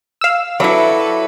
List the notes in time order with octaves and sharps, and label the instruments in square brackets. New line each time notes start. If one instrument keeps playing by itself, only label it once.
[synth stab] F5 E6
[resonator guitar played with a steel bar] F#3 E4 [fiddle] A4 B4 [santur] D5 E5 B5